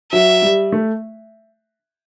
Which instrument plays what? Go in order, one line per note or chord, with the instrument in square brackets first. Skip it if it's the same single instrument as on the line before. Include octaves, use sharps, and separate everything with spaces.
[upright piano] F#3 [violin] E5
[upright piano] G3
A3